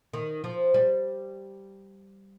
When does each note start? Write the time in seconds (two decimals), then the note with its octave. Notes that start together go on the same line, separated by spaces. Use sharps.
0.13 D#3
0.44 F3
0.74 G3